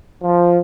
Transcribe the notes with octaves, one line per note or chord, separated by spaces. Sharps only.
F3